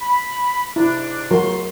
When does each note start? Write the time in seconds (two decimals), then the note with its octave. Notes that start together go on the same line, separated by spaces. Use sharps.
0.01 B5
0.76 G#2 C3 D4 E4
1.31 C#2 F#3 A3 F#4 A#4 C6